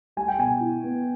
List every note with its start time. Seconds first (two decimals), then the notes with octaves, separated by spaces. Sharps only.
0.17 G3 G#5
0.28 G5
0.39 B2 G#5
0.61 E4
0.84 B3